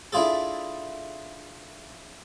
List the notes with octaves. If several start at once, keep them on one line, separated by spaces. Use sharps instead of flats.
D4 E4 F4 G#4 A4